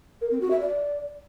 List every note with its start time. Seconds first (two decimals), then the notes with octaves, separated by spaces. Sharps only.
0.21 A#4
0.31 C4
0.41 F#4
0.51 E5
0.60 D5